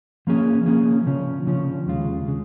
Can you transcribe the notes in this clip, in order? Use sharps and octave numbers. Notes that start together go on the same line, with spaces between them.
F3 A#3 C#4 G#4
F3 A#3 C#4 G#4
C#3 F3 C#4
C#3 F3 C#4
D#2 C#3 G#3 F4
C#3 G#3